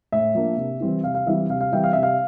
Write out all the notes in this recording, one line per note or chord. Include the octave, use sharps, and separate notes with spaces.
A2 E5
F3 A#3 D4
C3
E3 G3 C4 E4
C3 F5
F5
E3 G3 C4 E4 E5
C3 F5
F5
E3 G3 C4 E4 E5 G5
F5
C3 E5
F5